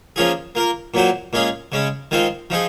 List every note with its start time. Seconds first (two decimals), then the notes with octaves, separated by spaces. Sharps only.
0.16 F3 A#3 C#4 F4 G#4
0.55 A#3 F4 A#4
0.94 A#2 F#3 C4 F#4 C5
1.33 A#2 G#3 C#4 F4 G#4
1.72 C#3 G#3 C#4
2.11 D#3 G#3 C4 F4 C5
2.50 F3 C4 D#4 G#4